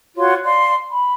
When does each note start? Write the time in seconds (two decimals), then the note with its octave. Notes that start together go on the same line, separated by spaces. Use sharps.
0.17 F4 F#4 C#5 C6
0.44 D5 F5 C6
0.91 B5